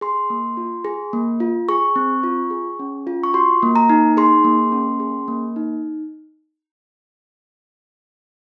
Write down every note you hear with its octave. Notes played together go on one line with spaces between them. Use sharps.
G#4 C6
A#3
F4
G#4
A#3
F4
G#4 C#6
C4
F4
G#4
C#4
F4
C#6
F#4 C6
A#3
A#5
D#4
G#4 C6
A#3
C#4
G#4
A#3
D#4